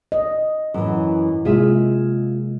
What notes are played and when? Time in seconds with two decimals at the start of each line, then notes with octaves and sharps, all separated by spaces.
0.12 D#5
0.74 F#2 E3
1.45 C3 G#3 A#3 F4 G#4 E5